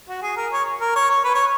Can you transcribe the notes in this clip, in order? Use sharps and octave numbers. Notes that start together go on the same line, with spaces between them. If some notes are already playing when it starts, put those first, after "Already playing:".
F#4
G#4
A#4
C#5
A#4
C#5
C#5
B4
C#5